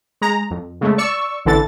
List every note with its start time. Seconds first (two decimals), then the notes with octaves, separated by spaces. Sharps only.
0.22 G#3 A#5
0.51 F2
0.81 C#3 G#3 A3
0.98 D5 C#6 E6
1.45 A1 D3 E3 A4 A6